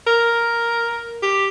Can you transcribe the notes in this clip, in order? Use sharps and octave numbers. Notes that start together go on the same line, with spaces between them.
A#4
G4